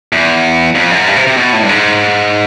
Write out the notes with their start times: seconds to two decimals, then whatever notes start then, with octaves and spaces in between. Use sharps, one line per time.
0.13 E2
0.75 F2
0.91 F#2
1.06 G2
1.16 C3
1.27 C3
1.37 B2
1.53 A2
1.63 G2
1.69 G#2